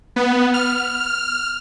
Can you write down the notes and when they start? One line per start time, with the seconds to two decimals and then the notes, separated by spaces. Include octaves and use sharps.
0.16 B3
0.54 F6